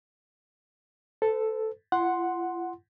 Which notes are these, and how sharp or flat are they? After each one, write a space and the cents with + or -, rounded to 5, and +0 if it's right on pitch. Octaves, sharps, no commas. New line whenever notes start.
A4 +0 C5 -45
F4 -45 F#5 +0 C6 +0